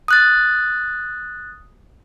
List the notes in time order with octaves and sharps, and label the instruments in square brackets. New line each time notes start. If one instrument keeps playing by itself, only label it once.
[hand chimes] D#6 F#6 A6